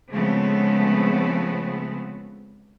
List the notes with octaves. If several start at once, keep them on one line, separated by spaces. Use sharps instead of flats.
C#3 F3 G#3 A3 B3 C4